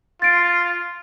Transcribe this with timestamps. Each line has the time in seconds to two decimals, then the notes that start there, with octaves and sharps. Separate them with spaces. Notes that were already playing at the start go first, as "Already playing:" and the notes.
0.22 F4 A6 D7